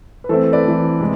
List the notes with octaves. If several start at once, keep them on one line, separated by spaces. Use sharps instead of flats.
B4
E3 A3 C4 A4 C5
B4 D5
E3 A3 C4
C3 G#3